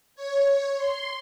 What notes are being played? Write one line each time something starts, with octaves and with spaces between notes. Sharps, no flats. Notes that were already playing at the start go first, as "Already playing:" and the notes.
C#5
C6